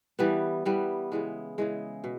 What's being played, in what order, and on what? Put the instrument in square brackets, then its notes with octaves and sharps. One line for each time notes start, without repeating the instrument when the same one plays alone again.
[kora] E3 G3 B3
E3 G3 B3
C#3 E3 G#3
C#3 E3 G#3
B2